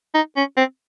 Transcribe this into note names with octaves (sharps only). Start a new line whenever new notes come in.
D#4
C#4
C4